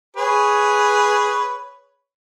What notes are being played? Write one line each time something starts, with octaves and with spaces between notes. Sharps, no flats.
G#4 B4 C#5